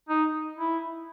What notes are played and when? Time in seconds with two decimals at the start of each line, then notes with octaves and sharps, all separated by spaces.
0.09 D#4
0.58 E4